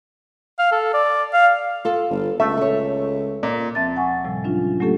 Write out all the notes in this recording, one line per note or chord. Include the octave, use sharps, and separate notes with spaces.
F5
A4
D5
F5
F4 A4
G1
C#2 A3 E5
A4 C#5
A#2
D2 F3 C4 E5 A5 A6
F#5 G#5 C#6
A2 C3 F3 G3
F#3 C#4 D4 F4
D4
F#3 A3 A#3 C#4 G4 A4